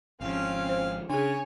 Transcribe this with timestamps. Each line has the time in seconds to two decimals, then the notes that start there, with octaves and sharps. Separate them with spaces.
0.21 G#1 F3 C4 C#4 F5
0.69 C5
1.10 C#3 D4 G#4 C#5 G#5